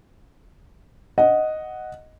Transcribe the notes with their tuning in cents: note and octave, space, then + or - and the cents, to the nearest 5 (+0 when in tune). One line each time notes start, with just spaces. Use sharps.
D#5 +0 F#5 +0